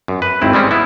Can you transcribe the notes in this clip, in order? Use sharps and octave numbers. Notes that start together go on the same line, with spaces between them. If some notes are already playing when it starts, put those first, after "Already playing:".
F#2
B4
G#1 D#2 C4 E4
G3 G#3 C4 C#4
B3 E4